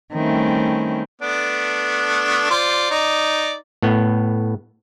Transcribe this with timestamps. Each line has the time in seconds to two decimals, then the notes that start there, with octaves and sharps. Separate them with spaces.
0.13 D#3 G3 A3 C4 C#4 E4
1.22 A3 B3 D4
2.51 F4 C5 D5
2.91 D#4 D5
3.82 A2 B3